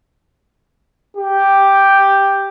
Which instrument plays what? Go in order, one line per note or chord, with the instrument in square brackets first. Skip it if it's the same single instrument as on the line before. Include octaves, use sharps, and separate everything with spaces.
[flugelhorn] G4